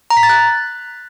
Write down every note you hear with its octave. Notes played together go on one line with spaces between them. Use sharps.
A#5
B6
A6
F#6